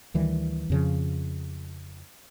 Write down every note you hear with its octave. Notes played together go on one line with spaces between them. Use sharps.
D2 D#3 E3 G3
F2 C#3 F3